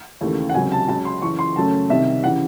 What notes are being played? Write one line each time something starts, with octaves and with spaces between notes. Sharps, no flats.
D#2 C#3 E3 A3
F#5
C#2 C3 F#3 G#5
A5
C#2 C#3 F#3 A5
C6
F#2 C#3 E3 C#6
C6
F#2 C#3 F#3 A3 A5
C2 C3 D#3 E5
C#3 E3 F#5